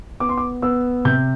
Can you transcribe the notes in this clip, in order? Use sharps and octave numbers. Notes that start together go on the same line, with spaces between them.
B3 D6
C6
D6
B3 E6
C3 G6